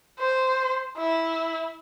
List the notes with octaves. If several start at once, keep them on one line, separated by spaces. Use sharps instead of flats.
C5
E4